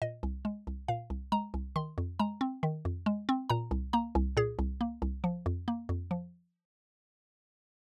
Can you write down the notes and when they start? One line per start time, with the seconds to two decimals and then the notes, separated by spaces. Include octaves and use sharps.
0.02 A#2 D#5
0.23 C2
0.45 G#3
0.67 C2
0.88 A#2 F5
1.10 C2
1.32 G#3 A#5
1.54 C2
1.76 D#3 C6
1.98 F2
2.19 G#3 A#5
2.41 C4
2.63 D#3
2.85 F2
3.06 G#3
3.29 C4
3.50 A#2 A#5
3.71 C2
3.93 A#3 A#5
4.15 C2
4.37 A#2 G#4
4.59 C2
4.81 A#3
5.02 C2
5.24 F3
5.46 F2
5.68 A#3
5.89 F2
6.11 F3